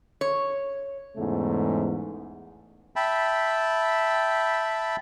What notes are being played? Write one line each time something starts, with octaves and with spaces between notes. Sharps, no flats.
C#5
E2 G#2 C#3 A3
E5 G5 A5 B5